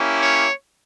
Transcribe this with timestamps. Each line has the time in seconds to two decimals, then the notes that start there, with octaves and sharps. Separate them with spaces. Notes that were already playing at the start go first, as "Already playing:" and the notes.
Already playing: A#3 C#4 E4 G4
0.22 C#5